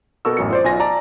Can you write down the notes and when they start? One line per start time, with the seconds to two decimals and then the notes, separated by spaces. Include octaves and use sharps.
0.25 B2 A4 A#4 C#6 E6
0.37 A1 F#2 C#7
0.51 F4 C5 D5
0.64 B1 F4 G#5 A#6
0.80 D5 A5 A#5